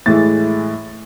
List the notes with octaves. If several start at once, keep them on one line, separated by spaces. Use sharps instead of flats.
A2 E3 G#3 A6